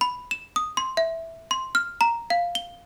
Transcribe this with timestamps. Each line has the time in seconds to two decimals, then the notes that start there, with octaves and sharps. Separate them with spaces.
0.01 B5
0.31 E7
0.56 D#6
0.77 C6
0.97 E5
1.51 C6
1.75 F6
2.01 A#5
2.30 F5
2.55 G7